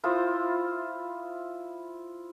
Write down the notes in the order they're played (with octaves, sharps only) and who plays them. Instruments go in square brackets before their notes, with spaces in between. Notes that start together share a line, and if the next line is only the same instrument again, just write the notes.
[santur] E4 F4 C5 D#6